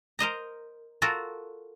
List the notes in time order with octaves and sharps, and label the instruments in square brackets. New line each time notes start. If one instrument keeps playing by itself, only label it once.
[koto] A#4 C5 D#5 A#5
F4 F#4 A4 A#4